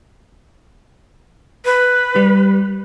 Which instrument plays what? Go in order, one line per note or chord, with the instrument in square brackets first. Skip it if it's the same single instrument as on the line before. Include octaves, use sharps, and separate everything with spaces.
[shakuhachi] B4
[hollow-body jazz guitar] G3